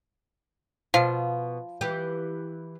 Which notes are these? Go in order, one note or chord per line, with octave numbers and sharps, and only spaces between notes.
B2 F3 F5
E3 G4